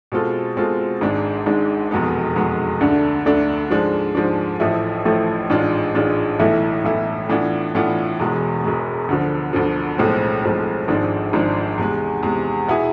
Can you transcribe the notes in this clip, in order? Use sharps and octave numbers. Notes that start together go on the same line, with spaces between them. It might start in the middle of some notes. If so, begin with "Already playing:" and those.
B2 G#3 C4 F4 A4
B2 G#3 C4 F4 A4
G#1 G#2 G#3 D4
G#1 G#2 G#3 D4
F1 E2 B2 G#3 B3
F1 E2 B2 G#3 B3
D2 D3 A3 D4
D2 D3 A3 D4
G#2 F3 G#3 D4
G#2 F3 G#3 D4
A1 A2 F3 A3 E4
A1 A2 F3 A3 E4
A1 G#2 G#3 D4 F4
A1 G#2 G#3 D4 F4
B1 A2 E3 A3 E4
B1 A2 E3 A3 E4
A2 E3 B3 D4 F4
A2 E3 B3 D4 F4
E1 E2 B2 G#3
E1 E2 B2 G#3
D2 D3 F3
D2 D3 F3
B1 A2 F3 G#3 C4
B1 A2 F3 G#3 C4
G#1 G#2 F3 G#3 D4
G#1 G#2 F3 G#3 D4
E2 C3 G#3
E2 C3 G#3
B2 B3 E4 G#4